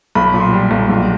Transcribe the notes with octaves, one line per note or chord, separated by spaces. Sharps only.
B1 B5
A#2
C6
G3
B1
A#1